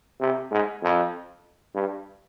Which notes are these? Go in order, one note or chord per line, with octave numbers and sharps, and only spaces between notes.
C3
G#2
F2
G2